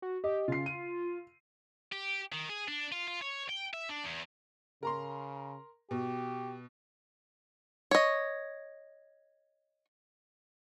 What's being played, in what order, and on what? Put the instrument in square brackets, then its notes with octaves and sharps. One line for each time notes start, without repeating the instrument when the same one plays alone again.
[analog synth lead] F#4
[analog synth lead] G4 [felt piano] D#5
[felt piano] C#3 C7 [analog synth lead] F4
[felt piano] D#7
[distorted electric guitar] G4
D#3
G#4
D4
F4
F4
C#5
G5
E5
D4
E2
[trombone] C#3 [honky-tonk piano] A#4 A#5 C6
[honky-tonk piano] B2 [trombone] G4
[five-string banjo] C#5 D#5